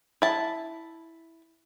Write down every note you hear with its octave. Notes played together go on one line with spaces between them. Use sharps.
E4 A5